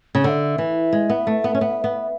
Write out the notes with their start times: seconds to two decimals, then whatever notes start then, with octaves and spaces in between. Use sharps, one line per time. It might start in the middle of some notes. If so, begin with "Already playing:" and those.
0.15 C#3
0.24 D3 E5 F#5
0.58 E3
0.93 G#3
1.10 B3
1.27 A3
1.44 B3
1.55 C#4
1.61 B3
1.84 B3